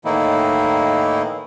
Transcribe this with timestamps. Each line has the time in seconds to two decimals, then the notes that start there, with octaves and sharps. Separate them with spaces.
0.05 A2 D#3 E3 A#3 D#4 E4